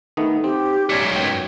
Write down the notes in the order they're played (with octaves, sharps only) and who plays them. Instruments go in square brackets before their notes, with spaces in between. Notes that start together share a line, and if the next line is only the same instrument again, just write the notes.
[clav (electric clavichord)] D#3 A3 B3 [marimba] D#4
[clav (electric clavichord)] C4 [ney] G4
[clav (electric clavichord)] B1 C#4 D5 [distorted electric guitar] G#2 A3 [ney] C#5
[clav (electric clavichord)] F#2 B2 G5